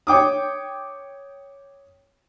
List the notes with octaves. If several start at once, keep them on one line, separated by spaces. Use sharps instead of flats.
C#5 G5 D6 D#6